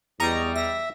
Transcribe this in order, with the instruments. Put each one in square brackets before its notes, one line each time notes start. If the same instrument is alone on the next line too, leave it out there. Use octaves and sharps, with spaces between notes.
[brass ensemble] E2 [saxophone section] G3 [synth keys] D#5 A#5 C#6
[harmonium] E5 [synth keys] A#6